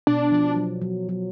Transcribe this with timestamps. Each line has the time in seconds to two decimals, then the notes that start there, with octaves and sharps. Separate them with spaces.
0.07 B2 D4
0.32 F3
0.56 F#3
0.82 F#3
1.09 F#3